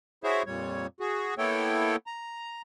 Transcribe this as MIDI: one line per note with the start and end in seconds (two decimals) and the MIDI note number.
0.24 0.43 64
0.24 0.43 66
0.24 0.43 68
0.24 0.43 72
0.24 0.43 73
0.24 0.43 76
0.46 0.87 41
0.46 0.87 46
0.46 0.87 55
0.46 0.87 73
1.00 1.34 66
1.00 1.34 68
1.38 1.96 58
1.38 1.96 59
1.38 1.96 64
1.38 1.96 69
1.38 1.96 73
1.38 1.96 79
2.07 2.62 82